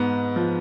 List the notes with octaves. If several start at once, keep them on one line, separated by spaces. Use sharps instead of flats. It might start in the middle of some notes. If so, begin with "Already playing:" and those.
Already playing: G#2 B3
F3